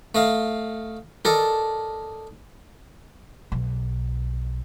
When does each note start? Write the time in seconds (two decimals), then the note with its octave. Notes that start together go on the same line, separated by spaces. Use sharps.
0.15 A3 D#5 F5
1.25 A4 A#4 D5 D#5
3.52 B1